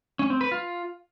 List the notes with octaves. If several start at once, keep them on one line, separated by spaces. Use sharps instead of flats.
C#4
C4
B4
F4